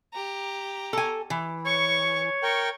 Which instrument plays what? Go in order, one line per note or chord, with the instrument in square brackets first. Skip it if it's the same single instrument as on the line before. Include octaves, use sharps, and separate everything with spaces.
[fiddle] G4 A#5
[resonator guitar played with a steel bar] A4 G#5
E3
[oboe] C#5 [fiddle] C#6
[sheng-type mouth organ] A#4 G5 [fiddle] C#6